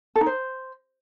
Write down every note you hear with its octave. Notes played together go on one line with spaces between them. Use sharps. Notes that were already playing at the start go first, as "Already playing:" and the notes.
A4
D#4
C5